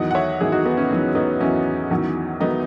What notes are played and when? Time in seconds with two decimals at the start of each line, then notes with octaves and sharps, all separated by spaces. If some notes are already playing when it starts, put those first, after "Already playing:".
Already playing: E2 D#3 F#3 D#5 F#5
0.11 F#5
0.15 C#5 E5
0.40 E2 D#3 F#3 E4 G#4
0.52 D#4 F#4
0.65 B3 D#4
0.77 C#4
0.91 E2 D#3 F#3
1.15 B3 D#4
1.40 E2 D#3 F#3 C#4 E4
1.91 E2 D#3 F#3
2.40 D#3 F#3 B3 D#4